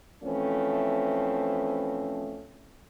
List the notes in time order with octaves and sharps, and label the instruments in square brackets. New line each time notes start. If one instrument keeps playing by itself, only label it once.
[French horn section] E3 F3 A3 C4 C#4